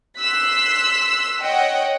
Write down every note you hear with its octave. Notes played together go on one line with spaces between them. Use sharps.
C6 E6 F#6 B6
C#5 D#5 F#5 G5